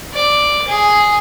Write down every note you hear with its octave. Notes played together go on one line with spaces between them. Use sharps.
D5
G#4